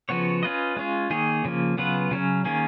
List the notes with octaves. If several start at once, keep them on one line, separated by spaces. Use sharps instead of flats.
C#3 F3 B3 F#4 C#5
C#4 F4 B4 D#5
G#3 C#4 F4
D#3 A#3 D#4 G#4 C#5
C#3 F3 A#3
C#3 F#3 B3 F4 B4
C#3 F#3 C#4
D#3 A#3 C#4 G#4